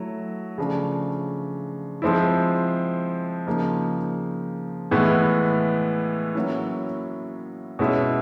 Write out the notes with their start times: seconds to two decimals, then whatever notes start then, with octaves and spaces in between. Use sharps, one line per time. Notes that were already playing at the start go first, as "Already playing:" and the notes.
Already playing: F#3 A3 E4
0.58 C#3 F3 A3 D4
2.02 F3 G#3 C4 E4
3.47 C#3 F3 A#3 D#4
4.91 A2 E3 G#3 B3
6.35 F#3 A#3 C#4 E4
7.79 B2 G#3 C#4 E4